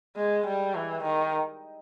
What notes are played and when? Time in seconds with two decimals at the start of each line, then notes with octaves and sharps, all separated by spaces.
0.16 G#3
0.46 G3
0.75 E3
1.03 D#3